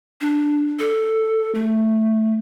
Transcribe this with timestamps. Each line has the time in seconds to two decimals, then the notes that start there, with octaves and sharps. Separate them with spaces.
0.21 D4
0.79 A4
1.55 A3